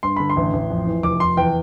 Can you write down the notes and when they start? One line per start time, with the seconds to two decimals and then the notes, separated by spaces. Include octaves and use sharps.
0.03 G2 C6
0.16 D3 B5
0.30 C6
0.36 A1
0.53 A1
0.70 F2
0.87 E3
1.03 F1 D6
1.20 F1 C6
1.37 E2 G5